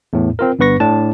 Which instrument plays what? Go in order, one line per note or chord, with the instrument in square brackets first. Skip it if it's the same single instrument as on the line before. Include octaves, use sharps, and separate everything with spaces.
[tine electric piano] E2 A2
C4 F4 A#4
G1 G2 B3 B4 C#6 A#6
A2 D4 A5